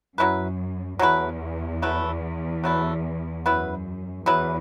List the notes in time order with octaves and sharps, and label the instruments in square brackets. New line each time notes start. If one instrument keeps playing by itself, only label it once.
[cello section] F#2 [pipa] F#3 A3 E4 B4
[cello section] E2 [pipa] F#3 A3 E4 B4
[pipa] F#3 A3 E4 B4
F#3 A3 E4 B4
[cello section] F#2 [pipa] F#3 B3 E4 B4
[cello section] E2 [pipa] F#3 B3 E4 B4